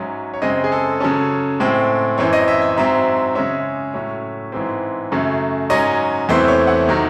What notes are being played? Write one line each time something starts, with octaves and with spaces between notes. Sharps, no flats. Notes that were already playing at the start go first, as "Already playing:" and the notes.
Already playing: G#2 F#3 C#4 E5
C#5
F#2 C#3 G#3 C4 D#5
G#4
A4
C#3 F#3 C#4 A4
A2 G#3 C4
F#2 E3 C4 C#5
D#5
E5
E5
G#2 F#3 C4 E5
C#3 G#3 C#4 E5
A2 F#3 C#4
G#2 E3 C4
F#2 C#3 F#3 A3
G#2 F#3 C#4 D#5
E2 C3 E3 A3 C4 C5
C#5
F#5
C3 D#3 F#3